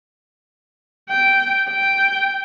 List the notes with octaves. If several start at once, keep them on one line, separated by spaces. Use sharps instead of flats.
G5
G5